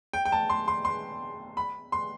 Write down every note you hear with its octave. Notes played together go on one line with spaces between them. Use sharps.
G5
G5
A5
C6
C6
C6
B5
C6